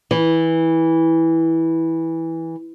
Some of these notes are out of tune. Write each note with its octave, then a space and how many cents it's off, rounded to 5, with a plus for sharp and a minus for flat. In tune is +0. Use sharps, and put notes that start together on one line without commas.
E3 -10